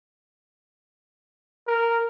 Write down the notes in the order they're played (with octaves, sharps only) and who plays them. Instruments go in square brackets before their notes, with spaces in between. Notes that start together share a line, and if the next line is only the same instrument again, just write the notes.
[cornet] A#4